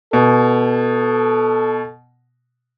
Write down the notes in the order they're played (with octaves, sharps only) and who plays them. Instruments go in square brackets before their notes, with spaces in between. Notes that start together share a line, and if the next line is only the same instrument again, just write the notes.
[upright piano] B2 [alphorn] A4